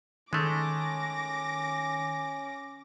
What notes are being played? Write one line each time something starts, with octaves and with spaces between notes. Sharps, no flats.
D#3 G#3 A3 C#4 D6 A#6